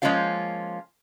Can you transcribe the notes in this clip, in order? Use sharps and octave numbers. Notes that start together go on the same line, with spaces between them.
F3 G#3 A#3 C#4 F4 F5